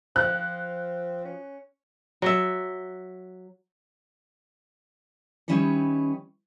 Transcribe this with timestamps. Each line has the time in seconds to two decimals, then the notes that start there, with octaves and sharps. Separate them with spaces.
0.16 F3 C4 F#6
1.25 C#4
2.22 F#3 E5
5.48 D#3 G3 C#4 E4 B4 C#5